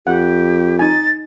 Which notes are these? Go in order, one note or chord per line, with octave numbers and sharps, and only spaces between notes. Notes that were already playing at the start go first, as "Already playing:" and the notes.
F2 G4 F#5
D#4 G#5 A6